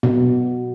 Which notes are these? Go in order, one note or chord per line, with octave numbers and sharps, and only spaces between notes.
B2